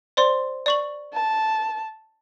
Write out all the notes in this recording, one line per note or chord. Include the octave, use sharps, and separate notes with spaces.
C5 D5 C6
D5 C#6 F#7
A5